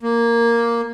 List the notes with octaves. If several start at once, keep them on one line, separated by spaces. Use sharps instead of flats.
A#3